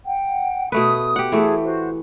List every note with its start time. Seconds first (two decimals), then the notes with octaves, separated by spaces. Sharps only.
0.06 F#5 G5
0.72 B2 A3 B4 D#6
1.16 G4 F#5
1.32 E3 A3 G#4 A4
1.64 F#4 C5